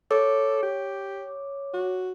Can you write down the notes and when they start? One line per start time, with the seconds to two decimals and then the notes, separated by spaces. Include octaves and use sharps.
0.11 A4 C#5 D6
0.63 G4
1.73 F#4